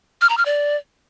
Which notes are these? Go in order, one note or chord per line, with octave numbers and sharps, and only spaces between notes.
F6
A#5
F6
D5